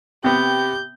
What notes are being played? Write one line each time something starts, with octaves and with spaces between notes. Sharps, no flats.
C3 B3 G4 G6